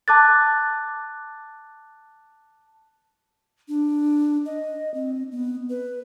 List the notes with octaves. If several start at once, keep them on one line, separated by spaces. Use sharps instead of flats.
A5 D6 F#6 A6
D4
D#5
C4
B3
B4